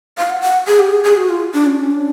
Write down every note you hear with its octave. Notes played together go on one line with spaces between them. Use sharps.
F5
F#5
F#5
G#4
G4
G#4
G#4
F#4
F4
D4
C#4
D4